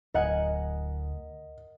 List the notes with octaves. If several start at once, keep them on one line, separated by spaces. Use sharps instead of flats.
D1 A#4 D#5 F#5 G#5